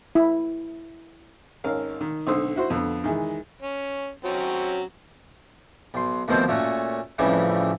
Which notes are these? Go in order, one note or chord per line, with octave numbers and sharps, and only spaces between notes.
E4
G#1 C#4 A#4 F5
D#3
B1 D3 C4 C5 D#6 E6
E4 F#4 C5
F2 D3 B3
D#3 E3 G#3
C#4
F#3 C4 C#4
B1 C6
D2 B2 D#3 F3 C4 C5
A#2 A3 C#4 F#4
A1 F2 C#3 E3 G3 A3